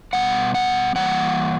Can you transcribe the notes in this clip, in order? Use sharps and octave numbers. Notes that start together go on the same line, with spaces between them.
B2 G3 B3 F#5
F#5
E3 G3 A#3 F#5